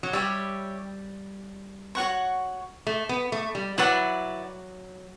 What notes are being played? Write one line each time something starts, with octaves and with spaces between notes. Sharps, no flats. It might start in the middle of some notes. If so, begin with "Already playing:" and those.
F#3
G3 G4 C#5 E5
F#4 C#5 F#5 C#6
A3
B3
A3
G3
F#3 E4 B4 D5 F#5